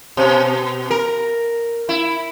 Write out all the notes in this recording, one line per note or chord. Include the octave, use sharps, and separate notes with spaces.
B2
A#4
E4